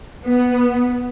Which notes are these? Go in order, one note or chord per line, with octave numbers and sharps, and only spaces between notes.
B3